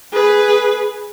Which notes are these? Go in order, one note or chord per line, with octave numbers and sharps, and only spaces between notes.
G#4 B4